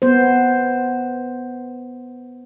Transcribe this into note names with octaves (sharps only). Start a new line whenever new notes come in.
B3 C5